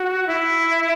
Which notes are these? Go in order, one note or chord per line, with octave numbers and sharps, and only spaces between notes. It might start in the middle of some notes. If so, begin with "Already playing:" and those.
Already playing: F#4
E4